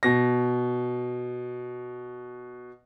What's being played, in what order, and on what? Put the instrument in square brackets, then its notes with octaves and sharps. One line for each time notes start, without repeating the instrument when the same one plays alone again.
[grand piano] B2 A#6